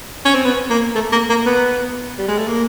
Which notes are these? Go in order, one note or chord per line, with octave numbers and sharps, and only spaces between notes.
C#4
C4
B3
A#3
A3
A#3
A#3
B3
G3
G#3
A3
A#3